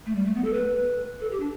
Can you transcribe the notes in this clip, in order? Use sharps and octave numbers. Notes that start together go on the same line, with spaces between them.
A3
G3
A3
B3
A4
B4
A4
G4
D4